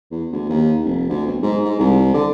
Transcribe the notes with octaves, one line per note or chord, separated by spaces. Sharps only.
E2
D2
D#2
F1
D2
B1
G#2
G#2
C2
D3